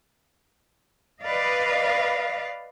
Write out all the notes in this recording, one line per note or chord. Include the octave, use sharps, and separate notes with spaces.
B4 D5 D#5 F5